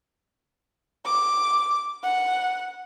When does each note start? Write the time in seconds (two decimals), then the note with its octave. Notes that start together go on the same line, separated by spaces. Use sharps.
1.05 D6
2.03 F#5